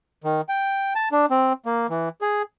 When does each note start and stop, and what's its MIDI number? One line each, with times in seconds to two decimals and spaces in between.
0.24 0.41 51
0.49 0.93 79
0.95 1.09 81
1.12 1.26 62
1.31 1.53 60
1.66 1.87 58
1.90 2.09 52
2.21 2.42 68